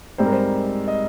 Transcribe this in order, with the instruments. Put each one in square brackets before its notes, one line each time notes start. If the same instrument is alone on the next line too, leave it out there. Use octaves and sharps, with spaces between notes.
[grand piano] G#2 G3 C4 C5
A#4
C5
D#5